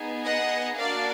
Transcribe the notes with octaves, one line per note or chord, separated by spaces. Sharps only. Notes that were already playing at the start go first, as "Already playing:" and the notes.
Already playing: B3 D#4 G#4
D#5 F#5
A#3 D4 F#4 D5 F5